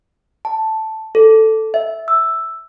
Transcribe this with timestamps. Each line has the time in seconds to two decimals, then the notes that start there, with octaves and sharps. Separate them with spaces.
0.45 A5
1.15 A4
1.74 E5
2.08 E6